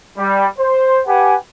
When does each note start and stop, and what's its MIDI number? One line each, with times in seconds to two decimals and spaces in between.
0.18 0.46 55
0.58 1.00 72
1.07 1.35 67
1.07 1.35 71
1.07 1.35 78
1.07 1.35 80